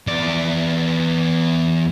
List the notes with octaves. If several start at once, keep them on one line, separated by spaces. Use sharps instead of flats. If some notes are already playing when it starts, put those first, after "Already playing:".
E2 D5